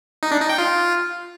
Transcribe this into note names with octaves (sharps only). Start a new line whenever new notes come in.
D#4
D4
D#4
G5
F4